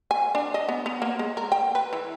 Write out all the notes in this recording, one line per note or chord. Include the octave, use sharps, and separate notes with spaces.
G#5
D4
D#5
B3
B3
A#3
G#3
A#4
G5
B4
E3